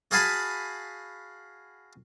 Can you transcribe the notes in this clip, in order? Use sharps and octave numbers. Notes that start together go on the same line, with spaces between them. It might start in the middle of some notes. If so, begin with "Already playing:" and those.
F#4 G#4 F5 G#5 A5 B5